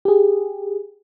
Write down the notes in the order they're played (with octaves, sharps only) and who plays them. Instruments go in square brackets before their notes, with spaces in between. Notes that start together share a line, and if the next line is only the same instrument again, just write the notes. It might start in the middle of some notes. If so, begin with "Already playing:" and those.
[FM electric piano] G4 G#4